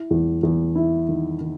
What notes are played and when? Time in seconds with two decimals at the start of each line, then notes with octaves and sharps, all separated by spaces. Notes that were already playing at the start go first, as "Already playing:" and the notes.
Already playing: E4
0.11 E2
0.43 E2
0.75 E4
1.09 D#3
1.41 D#3